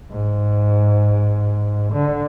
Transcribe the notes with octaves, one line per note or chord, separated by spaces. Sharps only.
G#2
D3